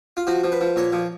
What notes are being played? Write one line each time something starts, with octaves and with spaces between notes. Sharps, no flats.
F4
F3 F#4
F3
B4
F3
A#2 C#5
F3